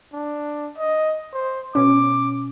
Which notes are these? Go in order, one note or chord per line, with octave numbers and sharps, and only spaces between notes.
D4
D#5
C5
B2 C#4 D6